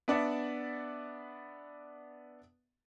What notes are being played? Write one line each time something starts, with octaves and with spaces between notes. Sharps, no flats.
B3 D4 D5 E5 F#5